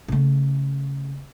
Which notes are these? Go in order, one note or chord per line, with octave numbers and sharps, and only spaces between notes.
C#3 A3